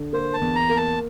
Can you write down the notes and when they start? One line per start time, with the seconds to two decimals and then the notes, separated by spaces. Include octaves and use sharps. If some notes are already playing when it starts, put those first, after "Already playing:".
Already playing: D3
0.13 A#3 C5
0.34 A5
0.41 E2
0.55 A#5
0.69 A#3
0.77 A5